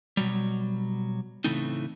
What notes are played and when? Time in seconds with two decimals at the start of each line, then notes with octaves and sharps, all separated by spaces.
0.17 B2 F#3 G3
1.44 A2 C#3 E3 A3 C4 D#4